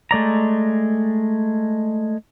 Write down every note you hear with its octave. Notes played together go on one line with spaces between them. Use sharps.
G#3 A3 D5 A#5